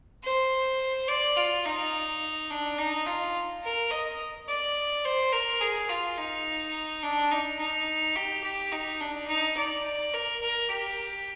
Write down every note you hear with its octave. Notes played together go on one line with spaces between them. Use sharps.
C5
D5
F4
D#4
D4
D#4
F4
A#4
D#5
D5
C5
A#4
G#4
F4
D#4
D4
D#4
D#4
G4
G4
D#4
D4
D#4
D5
A#4
A#4
G4